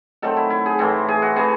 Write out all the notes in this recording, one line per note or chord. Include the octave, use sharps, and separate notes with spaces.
D#3 F#3 A3 C4 A4
E4
E4
G#4
A2 E3 C4 A4
G#4
F#4
E3 A3 C4 G#4